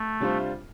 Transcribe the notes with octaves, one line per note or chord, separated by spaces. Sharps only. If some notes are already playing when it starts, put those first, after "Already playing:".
Already playing: A3
C3 G3 D4 F4 C5